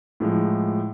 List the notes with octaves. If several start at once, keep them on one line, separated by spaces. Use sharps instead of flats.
A2 F3 G#3